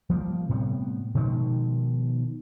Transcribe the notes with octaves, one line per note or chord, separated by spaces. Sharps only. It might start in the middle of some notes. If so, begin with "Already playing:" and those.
F3 G3 A#3
A2 C3 G3 B3
B2 D#3 F3 G#3